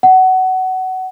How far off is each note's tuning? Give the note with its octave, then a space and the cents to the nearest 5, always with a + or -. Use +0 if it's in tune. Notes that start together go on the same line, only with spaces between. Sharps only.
F#5 +20